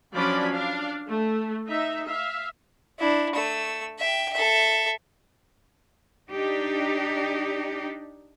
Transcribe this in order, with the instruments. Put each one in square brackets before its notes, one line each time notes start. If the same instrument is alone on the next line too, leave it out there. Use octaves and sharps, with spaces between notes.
[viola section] F3 F#3 C#4 D4 D5 B5
D4 F5
A3
D#4 E5
E5 F5
[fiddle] D4 E4
A3 E6
E5 G5
A4 E5
[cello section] D4 D#4 G4